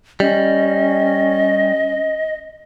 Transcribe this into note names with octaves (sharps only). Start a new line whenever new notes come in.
G3 C#4 D#5